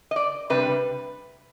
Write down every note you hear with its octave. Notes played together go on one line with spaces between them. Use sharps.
D#5
D5
C3 G3 D4 B4